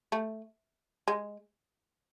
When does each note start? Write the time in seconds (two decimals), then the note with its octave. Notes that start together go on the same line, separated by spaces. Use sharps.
0.12 A3
1.08 G#3